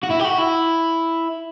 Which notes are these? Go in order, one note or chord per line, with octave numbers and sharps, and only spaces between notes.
F#4
E4
G4
F#4
E4